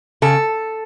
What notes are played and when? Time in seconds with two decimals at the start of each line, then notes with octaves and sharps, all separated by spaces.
0.22 C#3 A4